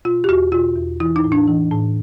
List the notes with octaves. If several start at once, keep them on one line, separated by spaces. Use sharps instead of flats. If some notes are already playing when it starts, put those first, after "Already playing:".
B2 F4
G4
E2 F#4
B2 F4
E2
E3 E4
D#4
A2
D4
E3
A2